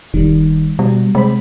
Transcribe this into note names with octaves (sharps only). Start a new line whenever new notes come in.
E1 D#3 G3
B2 G3
C3 G#3 C5 B5